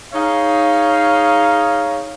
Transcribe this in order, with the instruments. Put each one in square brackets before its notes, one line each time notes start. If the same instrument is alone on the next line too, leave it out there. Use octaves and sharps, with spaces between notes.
[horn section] D#4 G#4 C#5 F5